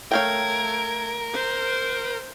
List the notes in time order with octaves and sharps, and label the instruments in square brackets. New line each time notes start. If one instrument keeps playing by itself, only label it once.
[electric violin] A3 G#6 [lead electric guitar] A#4 [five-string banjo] C#5 F5 G5
[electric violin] C5